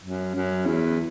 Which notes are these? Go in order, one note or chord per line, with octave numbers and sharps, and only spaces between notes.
F#2
F#2
E2